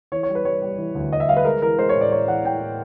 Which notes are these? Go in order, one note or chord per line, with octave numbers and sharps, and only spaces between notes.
E3 C#5
C#5
G3
B4
G3 C#5
G3
E3
D2
D2 D#5
E5
G3 F5
B4
G#3 A#4
E3 A#4
G#3 C5
C#5
A2
D5
G#3 C#5
E3 F#5
A2 G5
A2